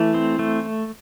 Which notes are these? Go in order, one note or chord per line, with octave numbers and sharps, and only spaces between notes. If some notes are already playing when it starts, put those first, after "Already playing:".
Already playing: E3 A3
C4
A3